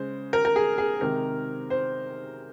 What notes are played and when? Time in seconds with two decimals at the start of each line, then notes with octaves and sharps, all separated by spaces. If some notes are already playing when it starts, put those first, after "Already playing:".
Already playing: C#3 G#3 C5
0.33 A#4
0.45 A#4
0.56 G#4
0.78 G#4
1.01 C3 D#3 G#3 A#4
1.70 C5